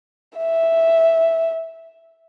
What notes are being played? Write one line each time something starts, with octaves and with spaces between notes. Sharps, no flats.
E5